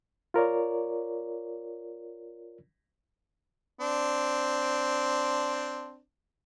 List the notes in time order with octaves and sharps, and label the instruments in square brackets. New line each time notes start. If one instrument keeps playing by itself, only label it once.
[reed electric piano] F4 A#4 C#5 D5
[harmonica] C4 D4